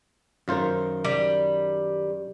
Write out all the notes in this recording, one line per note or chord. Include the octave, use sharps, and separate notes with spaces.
F#2 D#3 F4 A#4 C5
G3